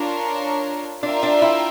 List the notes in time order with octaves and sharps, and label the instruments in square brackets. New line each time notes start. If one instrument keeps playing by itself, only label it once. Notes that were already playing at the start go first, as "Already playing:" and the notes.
Already playing: [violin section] D4 F4 A#4 C#5
[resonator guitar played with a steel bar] D4 [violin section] F4 A#4 E5 G5
[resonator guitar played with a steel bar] D4
E4